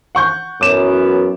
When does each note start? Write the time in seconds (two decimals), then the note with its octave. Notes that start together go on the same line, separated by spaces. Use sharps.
0.15 F#5 C#6 G6
0.61 F#2 E3 B3 D6 E7